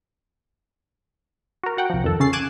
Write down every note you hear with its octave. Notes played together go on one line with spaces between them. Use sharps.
F#4 A#4
F#4 F#5 G5
C2 F3
F2 D#3 A4
C#3 C#4 A6 C7
D6 F#6 G#6 D#7 E7